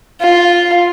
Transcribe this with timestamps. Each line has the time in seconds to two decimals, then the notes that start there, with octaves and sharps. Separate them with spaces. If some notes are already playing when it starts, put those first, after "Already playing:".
0.21 F4